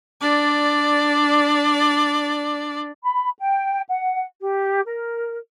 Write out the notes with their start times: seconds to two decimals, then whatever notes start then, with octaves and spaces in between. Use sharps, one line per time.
0.21 D4 D5
3.03 B5
3.39 G5
3.89 F#5
4.42 G4
4.86 A#4